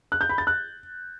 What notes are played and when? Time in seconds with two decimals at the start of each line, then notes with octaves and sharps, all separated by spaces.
0.12 F#6
0.21 G6
0.29 B5
0.38 A6
0.47 F#6